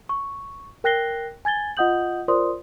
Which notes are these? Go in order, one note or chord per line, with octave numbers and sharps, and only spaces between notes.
C#6
A#4 G5 F#6 A#6 C7 G7
G#5 G#6 A6 G7
F4 D#5 F#5 D#6 G6 F#7
F4 A#4 C5 D5 C6 D#6